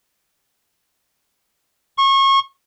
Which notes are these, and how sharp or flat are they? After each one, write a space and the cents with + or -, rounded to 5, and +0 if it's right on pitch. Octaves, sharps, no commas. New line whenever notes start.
C#6 -30